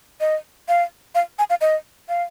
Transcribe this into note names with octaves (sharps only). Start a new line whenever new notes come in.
D#5
F5
F5
G#5
F5
D#5
F5